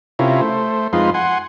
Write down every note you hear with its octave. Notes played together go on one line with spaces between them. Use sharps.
C3 C#4 E4 F4 A#4
A3 C5
F2 G#3 D#4 F4 B4 C6
F#5 G#5 C6